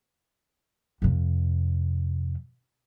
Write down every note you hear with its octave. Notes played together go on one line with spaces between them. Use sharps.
F2 C3